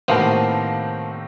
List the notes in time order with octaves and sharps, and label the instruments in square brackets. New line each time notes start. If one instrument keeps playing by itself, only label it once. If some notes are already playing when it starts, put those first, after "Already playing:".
[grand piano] A2 C3 D#3 [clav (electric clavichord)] A#3 B3 [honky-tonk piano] C5 F5 A5